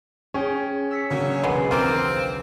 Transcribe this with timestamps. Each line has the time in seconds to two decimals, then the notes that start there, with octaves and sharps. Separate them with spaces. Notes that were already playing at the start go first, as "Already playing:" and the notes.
0.34 C#4 G#4 G5
0.91 E6 B6 C#7
1.10 C#3 F#3 A#3 C#4 D4
1.44 E1 B1 G#3 B3
1.71 D#2 A#3 C4 F4 D#7 E7